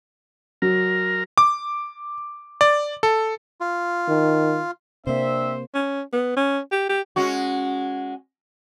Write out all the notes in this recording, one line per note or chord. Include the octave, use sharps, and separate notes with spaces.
F#3 A#4
D6
D5
A4
F4
D#3
C3 A#3 C4 D4 C5 E5
C#4
B3
C#4
G4
G4
G#3 C#4 F#4